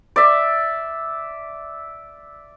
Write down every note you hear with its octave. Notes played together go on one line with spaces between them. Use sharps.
D5 E5